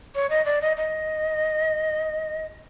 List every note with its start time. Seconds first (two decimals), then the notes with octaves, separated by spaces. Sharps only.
0.15 C#5
0.30 D#5
0.45 D5
0.61 D#5
0.77 D#5